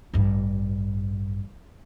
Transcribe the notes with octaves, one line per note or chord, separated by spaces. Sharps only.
A1 G2